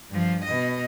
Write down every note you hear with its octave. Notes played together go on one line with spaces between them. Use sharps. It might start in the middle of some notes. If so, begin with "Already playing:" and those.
G2 F3
B2 D#5